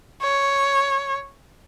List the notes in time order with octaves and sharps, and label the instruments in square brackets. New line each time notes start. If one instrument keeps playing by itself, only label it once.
[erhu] C#5